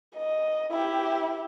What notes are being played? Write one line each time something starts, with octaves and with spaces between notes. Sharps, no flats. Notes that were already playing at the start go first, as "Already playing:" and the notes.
D#5
E4 G4